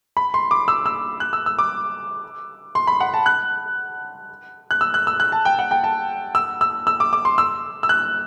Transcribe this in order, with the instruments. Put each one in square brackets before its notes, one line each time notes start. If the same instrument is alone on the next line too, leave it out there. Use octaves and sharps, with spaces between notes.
[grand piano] B5
C6
D6
E6
E6
F#6
E6
E6
D6
C6
B5
F#5
A5
F#6
F#6
E6
F#6
E6
F#6
A5
G5
F#5
G5
A5
E6
E6
E6
D6
D6
C6
E6
E6
F#6